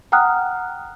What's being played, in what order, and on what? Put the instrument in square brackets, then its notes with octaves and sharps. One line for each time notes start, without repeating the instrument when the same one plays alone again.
[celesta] F#5 G5 A#5 D#6 F6 F#6